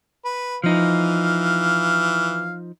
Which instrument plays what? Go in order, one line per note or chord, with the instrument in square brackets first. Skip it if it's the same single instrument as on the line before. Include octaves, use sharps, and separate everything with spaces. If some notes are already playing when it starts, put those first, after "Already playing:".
[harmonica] B4
[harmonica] E3 F5 F6 [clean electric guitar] F3 D#4